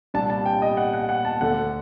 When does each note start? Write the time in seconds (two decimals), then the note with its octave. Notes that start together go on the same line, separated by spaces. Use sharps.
0.14 C2 A#2 G3 D4 A5
0.30 A5
0.46 G5
0.62 D#5
0.77 F#5
0.93 F#5
1.09 F#5
1.25 A5
1.41 D2 D3 A3 F#5